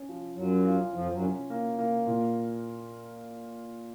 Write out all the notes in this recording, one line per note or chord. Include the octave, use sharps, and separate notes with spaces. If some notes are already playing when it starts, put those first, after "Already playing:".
Already playing: C#4
F3
F#2 F#3 F4
F4
F2 F3 F4
F#2 F#3
C#4
A#3
A#3
A#2